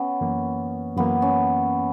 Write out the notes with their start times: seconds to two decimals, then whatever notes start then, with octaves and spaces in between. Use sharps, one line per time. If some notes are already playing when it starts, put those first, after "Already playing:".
Already playing: B3 C#4
0.21 F#2 E3 A#3
0.97 F#2 E3 A#3 B3
1.22 C#4